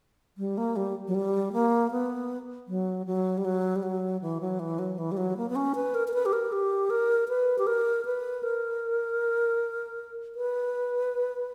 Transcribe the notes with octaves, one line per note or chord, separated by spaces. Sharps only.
G3
A#3
G3
F#3
G3
A#3
B3
F#3
F#3
G3
F#3
G3
F#3
E3
F#3
E3
F#3
E3
G3
F#3
A#3
B3
C#4
B4
A#4
A#4
B4
G4
A#4
G4
A#4
B4
G4
A#4
B4
A#4
B4